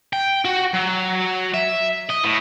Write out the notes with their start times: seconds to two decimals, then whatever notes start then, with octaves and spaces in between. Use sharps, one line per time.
0.13 G5
0.45 F#4
0.74 F#3
1.54 E5
2.09 D#5
2.24 A2